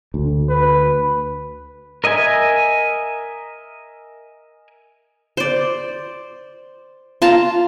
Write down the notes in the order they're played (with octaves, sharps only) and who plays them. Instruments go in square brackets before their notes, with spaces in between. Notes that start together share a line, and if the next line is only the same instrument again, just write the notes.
[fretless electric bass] D2
[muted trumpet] B4
[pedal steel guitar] A#4 D#5 E5 G#5
[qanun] C5 D5
F4 A5 A#5